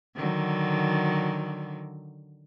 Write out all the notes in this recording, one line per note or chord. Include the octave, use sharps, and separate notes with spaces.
D3 D#3 F#3